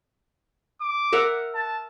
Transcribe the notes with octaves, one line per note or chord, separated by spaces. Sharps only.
D6
A#4 E5 F#5
A5